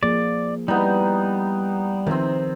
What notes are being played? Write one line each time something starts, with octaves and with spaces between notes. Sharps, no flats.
F3 A#3 G#4 D5
G3 B3 D#4 E4
C3 D#3 F3 C4